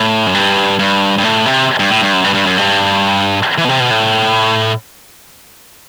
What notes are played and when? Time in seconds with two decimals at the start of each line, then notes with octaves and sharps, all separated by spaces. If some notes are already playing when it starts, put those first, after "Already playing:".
Already playing: A2
0.27 F#2
0.34 G2
0.79 G2
1.18 G2
1.23 A2
1.46 C3
1.80 G2
1.90 A2
2.01 G2
2.13 F#2
2.24 G2
2.34 G2
2.46 F#2
2.58 G2
3.58 E3
3.65 B2
3.69 C3
3.80 B2
3.91 A2